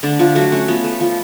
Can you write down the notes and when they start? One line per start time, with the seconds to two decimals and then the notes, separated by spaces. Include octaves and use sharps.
0.03 D3 A3 D4
0.19 F3 A3 F4
0.35 F#3 A3 F#4
0.52 A3 C#4
0.68 F3 B3
0.84 A3
1.01 F3